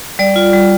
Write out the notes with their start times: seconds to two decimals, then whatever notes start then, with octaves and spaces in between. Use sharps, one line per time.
0.19 G3 D5
0.36 F4
0.53 G3